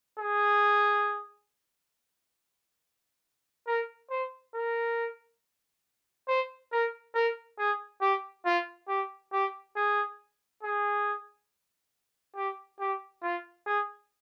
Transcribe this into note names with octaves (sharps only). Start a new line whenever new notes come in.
G#4
A#4
C5
A#4
C5
A#4
A#4
G#4
G4
F4
G4
G4
G#4
G#4
G4
G4
F4
G#4